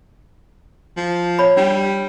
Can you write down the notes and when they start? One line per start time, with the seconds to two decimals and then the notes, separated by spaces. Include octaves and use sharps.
0.97 F3
1.39 C#5 B5
1.57 G3 D4